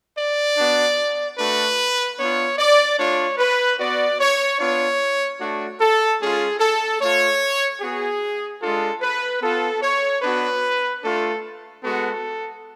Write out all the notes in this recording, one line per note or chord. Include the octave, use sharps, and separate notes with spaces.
D5
B3 D4 F#4
A3 D4 F#4 B4
B3 D4 F4 C#5
D5
A3 D4 F4 C#5
B4
B3 F#4 D5
C#5
B3 D4 F4 C#5
A3 D4 F#4
A4
G#3 C#4 F4 G#4
A4
A3 F4 C#5
B3 F#4 G#4
G#3 D4 F4 A4
B4
B3 F4 A4
C#5
B3 D4 F#4 B4
A3 D4 F4 A4
G#3 B3 F#4 A4